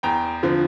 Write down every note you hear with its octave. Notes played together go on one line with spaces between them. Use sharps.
E2 G5 A#5
D3 F3 C4